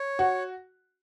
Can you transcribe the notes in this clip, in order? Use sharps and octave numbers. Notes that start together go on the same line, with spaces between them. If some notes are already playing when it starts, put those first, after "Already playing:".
Already playing: C#5
F#4